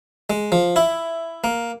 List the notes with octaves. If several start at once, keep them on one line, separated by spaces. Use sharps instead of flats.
G#3
F3
E4
A#3